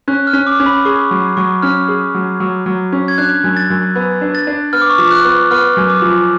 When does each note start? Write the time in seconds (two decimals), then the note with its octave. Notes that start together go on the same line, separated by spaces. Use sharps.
0.08 C#4 F#6
0.27 F6
0.33 C#4
0.47 D6
0.60 C#4
0.66 B5
0.85 G#4 C#6
1.11 F#3
1.37 F#3 C#6
1.62 C#4 F6
1.88 G#4
2.14 F#3
2.40 F#3
2.66 F#3
2.93 C#4
3.08 G#6
3.18 D4 F#6
3.44 F#2
3.57 A6
3.70 F#2
3.96 B3
4.21 D4
4.35 A6
4.47 D4
4.73 B3 F6
4.82 D6
4.90 C#6
4.98 F3 D6
5.11 F#6
5.25 B3
5.51 B3 F6
5.77 F#2
5.90 D6
6.02 F3